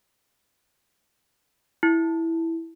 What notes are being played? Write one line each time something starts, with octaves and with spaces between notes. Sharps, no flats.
E4